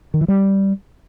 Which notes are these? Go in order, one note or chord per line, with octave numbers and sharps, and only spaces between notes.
D#3
E3
G3